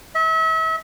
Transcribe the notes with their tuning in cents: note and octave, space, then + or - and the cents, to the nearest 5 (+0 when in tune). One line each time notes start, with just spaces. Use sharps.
E5 -35